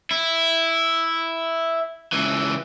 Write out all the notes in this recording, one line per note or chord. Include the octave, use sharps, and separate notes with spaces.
E4
C#2 E3